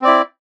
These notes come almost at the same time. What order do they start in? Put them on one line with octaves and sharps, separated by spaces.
C4 D5 E4